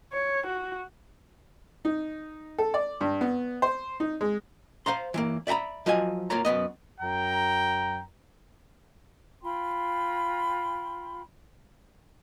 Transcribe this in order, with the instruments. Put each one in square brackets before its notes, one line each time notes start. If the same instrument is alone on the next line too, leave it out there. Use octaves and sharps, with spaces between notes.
[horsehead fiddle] C#5
F#4
[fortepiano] D#4
A4
D5
G2
B3
C5
D#4
G#3
[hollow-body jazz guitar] C5 F5 A#5 C6
E3 G#3 A#3
D5 E5 G5 A#5 B5
F3 F#3 D#5 F5 G#5
A#3 F4 A#4 C#5 A#5
F#2 C3 B3 D#5
[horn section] F#2 G5 A#5
[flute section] F4 G5 B5 C6